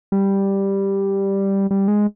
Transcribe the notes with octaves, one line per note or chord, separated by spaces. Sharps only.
G3
G3
G#3